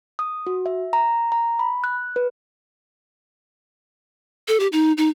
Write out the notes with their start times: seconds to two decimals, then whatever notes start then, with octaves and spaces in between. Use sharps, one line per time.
0.19 D#6
0.47 F#4
0.66 E5
0.93 A#5
1.32 A#5
1.59 B5
1.84 F#6
2.16 B4
4.48 A4
4.60 G4
4.72 D#4
4.97 D#4